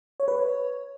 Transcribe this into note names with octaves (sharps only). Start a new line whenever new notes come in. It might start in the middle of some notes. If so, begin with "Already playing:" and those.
C#5
B4
C#5